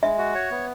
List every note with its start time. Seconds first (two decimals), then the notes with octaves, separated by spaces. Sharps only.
0.03 G#3 E5
0.18 F#4
0.35 C#5
0.51 B3